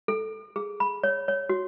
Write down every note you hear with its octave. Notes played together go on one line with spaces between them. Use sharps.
A4
G#4
B5
C#5
C#5
F#4